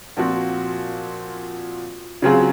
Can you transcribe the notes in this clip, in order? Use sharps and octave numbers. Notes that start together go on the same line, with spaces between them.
A#2 F3 C4 F#4
C#3 F#3 C4 F4 G#4